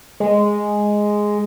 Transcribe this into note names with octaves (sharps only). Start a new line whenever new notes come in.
G#3